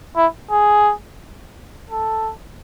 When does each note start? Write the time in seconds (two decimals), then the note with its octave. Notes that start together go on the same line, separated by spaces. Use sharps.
0.16 E4
0.51 G#4
1.90 A4